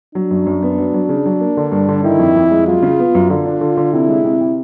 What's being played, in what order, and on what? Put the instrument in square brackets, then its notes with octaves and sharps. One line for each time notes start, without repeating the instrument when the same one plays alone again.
[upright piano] F#3 [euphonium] D4
[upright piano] F#2
F#2
B3
F#3
F#3
C#3
F#3
A#3
D3
G2
D3
[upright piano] D#3 [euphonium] E4
[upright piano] F2
F2
G#3
[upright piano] F#3 [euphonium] F4
[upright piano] C#3
B3
F#2
[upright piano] D3 [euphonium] F4
[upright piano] D4
D3
D3
[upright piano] C3 [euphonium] E4
[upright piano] G#3
C3
C3